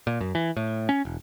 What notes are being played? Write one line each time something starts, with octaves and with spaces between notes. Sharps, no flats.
A#2
F#2
E3
A2
C#4
E1